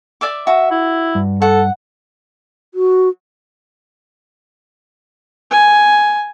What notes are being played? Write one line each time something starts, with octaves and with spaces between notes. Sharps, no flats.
D5 E5 D6
F#4 E5
E4
G2
A4 F#5
F#4
G#5